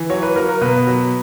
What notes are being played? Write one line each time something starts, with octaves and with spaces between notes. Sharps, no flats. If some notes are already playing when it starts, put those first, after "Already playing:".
Already playing: E3
F#3 C#5
B4
F#3 A#4
A#4
B2 B4
F#3